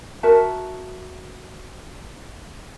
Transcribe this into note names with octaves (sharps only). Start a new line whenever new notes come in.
F#4 A#4 E5 A5